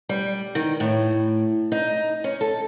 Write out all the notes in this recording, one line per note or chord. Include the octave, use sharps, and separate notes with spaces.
G3
D#3
A2
D#4
C#4
A4